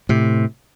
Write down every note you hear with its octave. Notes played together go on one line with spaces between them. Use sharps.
A2 C3